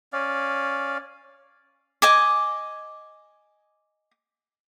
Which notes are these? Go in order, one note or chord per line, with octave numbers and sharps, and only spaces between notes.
C#4 D5 F5
D#5 G#5 D6